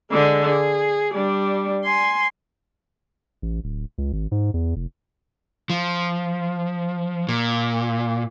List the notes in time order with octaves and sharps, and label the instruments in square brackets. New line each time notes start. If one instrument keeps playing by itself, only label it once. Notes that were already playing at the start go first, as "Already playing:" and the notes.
[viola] D3 G#3
G#4
G3 D4
G#5 C6
[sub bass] A1
D1
C#2
G#1
G#2
E2
F1
[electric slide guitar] F3
A#2